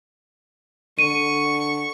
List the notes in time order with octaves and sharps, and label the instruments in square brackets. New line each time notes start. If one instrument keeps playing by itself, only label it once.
[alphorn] D3 [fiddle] C#6 [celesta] D#7